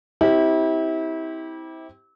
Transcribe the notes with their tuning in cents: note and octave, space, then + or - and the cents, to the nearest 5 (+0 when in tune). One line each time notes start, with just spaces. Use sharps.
C4 +0 E4 -30 G4 +0